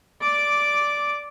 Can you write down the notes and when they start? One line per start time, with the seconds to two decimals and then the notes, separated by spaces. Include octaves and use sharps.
0.22 D5 D6